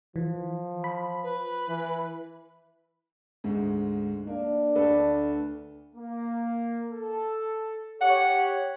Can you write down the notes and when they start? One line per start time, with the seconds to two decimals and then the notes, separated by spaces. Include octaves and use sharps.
0.16 E3 F3
0.84 B5
1.23 B4
1.68 E3
3.44 D2 G#2 G#3
4.27 A#3 D4
4.75 D2 A4 B4
5.96 A#3
6.92 A4
8.01 G4 C#5 F#5